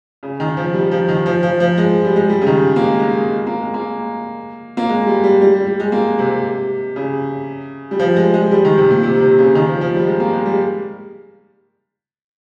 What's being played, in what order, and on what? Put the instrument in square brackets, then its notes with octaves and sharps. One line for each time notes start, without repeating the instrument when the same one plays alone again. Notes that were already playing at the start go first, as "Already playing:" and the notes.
[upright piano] C#3
D#3
F3
G3
F3
D#3
F3
F3
F3
G#3
G3
G#3
G3
C#3
D#3
A#3
G#3
G#3
G#3
A#3
G#3
A#3
A#3
G#3
G3
G3
G3
G3
G3
G#3
A#3
C3
C3
C#3
G3
F3
G#3
G#3
G3
D#3
C3
A#2
C3
C3
C#3
D#3
F3
F3
G3
G#3
A#3
G#3
G3